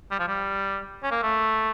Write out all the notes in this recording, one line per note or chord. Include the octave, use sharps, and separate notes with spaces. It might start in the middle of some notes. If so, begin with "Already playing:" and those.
G3
F3
G3
C#4
A#3
A3